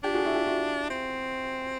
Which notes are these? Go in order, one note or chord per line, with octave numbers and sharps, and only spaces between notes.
D4 F4 G4
F#4 G#4
E4 F#4
F4 G4
E4 F#4
C4